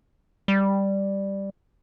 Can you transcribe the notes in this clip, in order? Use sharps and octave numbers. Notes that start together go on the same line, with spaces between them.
G3